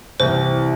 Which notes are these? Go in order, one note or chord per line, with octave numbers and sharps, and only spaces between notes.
C2 C3 E3 C5